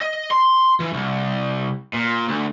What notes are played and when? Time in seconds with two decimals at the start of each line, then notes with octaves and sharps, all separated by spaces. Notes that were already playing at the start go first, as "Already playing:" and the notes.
0.01 D#5
0.31 C6
0.80 E3
0.93 C2
1.93 A#2
2.28 D2